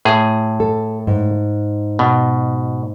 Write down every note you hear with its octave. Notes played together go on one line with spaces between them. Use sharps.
A2 G#4
A4
G#2
B2